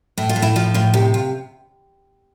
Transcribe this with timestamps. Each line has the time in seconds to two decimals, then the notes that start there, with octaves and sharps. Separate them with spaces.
0.18 A2 E4
0.29 F4
0.36 A2
0.42 E4
0.56 F3 F4
0.74 A2 F4
0.94 C3 G4
1.14 F4